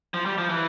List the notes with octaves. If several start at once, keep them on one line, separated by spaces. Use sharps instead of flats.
F3
G3
F3
E3